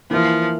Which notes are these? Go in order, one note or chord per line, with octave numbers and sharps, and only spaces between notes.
E3 F3 A#3 E4